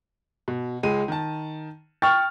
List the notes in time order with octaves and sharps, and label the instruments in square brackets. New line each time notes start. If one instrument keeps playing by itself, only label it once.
[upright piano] B2
C#2 G#3 D#7
D#3 A5
[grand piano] G5 C#6 F6 [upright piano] A6